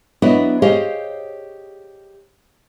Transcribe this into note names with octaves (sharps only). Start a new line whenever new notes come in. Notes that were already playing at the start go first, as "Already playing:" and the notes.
F#3 B3 D4 E4 B4 D#5
G4 G#4 C5 C#5 D#5 F5